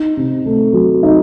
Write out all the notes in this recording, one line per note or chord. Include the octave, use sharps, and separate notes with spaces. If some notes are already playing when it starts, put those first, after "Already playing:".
Already playing: D#4
C3
A3
F#3
D#4